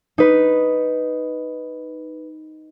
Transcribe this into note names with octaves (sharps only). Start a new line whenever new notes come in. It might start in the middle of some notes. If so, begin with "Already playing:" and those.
D#4 B4